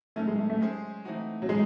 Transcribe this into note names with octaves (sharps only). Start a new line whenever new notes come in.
D#3 F#3 A3 C#4
G#3
A3
A3
G#3 C#4 G#4 C5
E3 A3 C4 D#4 F#4
F#3
E3 G#3 A3 D#4 G#4